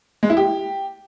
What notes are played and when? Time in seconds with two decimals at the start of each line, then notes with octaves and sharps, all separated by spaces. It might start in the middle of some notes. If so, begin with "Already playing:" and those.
0.23 G#3
0.30 E4
0.37 G4